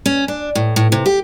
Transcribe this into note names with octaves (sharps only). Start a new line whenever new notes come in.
C#4
D4
A2
A2
C3
G4